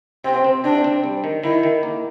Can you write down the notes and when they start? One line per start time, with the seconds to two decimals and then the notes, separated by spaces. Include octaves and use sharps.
0.24 C3 C4
0.44 C4
0.64 C3 D4
0.84 C4
1.04 G3
1.24 D#3
1.44 D#3 E4
1.63 D#3
1.83 A#3